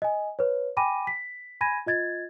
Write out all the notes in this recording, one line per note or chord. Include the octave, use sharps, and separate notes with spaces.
D#5 G#5
B4 C#5
G5 G#5 B5 D6 A#6 D#7
B6
G#5 B5 G#6 A#6 D#7
F4 D#5 G#6 A6